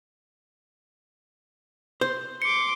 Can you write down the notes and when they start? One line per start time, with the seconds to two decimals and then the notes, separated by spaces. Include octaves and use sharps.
2.01 C5
2.42 C6 D6 C#7